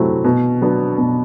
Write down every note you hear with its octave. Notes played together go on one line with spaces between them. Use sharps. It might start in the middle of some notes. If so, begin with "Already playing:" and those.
Already playing: C3 F#3 A3 C4 E4
B2
F#3 B3 D4
B2